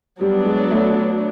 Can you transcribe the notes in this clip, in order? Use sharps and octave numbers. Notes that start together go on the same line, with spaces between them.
F#3 G3 B3 D4
G#3
A3